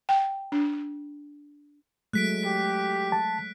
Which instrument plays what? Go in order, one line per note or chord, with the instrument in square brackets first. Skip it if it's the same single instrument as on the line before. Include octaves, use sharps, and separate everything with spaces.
[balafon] G5
D4
[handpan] F#3 G#3 A3 [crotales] F#6 B6 D7
[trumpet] G4
[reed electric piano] A5